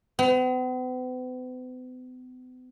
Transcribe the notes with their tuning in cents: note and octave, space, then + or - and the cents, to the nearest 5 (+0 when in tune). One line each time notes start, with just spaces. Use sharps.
B3 +45